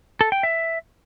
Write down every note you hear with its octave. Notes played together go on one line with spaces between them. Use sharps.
A4
G5
E5